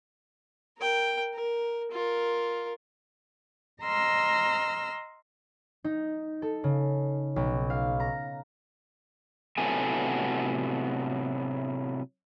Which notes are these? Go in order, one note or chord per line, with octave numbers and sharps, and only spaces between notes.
A#4 G5
A#4
F4 A#4
D#5 A#5 C6 E6 F6
D#4
A4
C#3
B1
F5
A#5
A2 C3 F#3 B3 A4 G#5